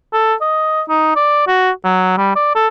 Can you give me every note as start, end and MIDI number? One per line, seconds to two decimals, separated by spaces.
0.13 0.34 69
0.41 0.81 75
0.89 1.15 63
1.16 1.46 74
1.47 1.70 66
1.84 2.15 54
2.17 2.33 55
2.36 2.53 74
2.55 2.68 69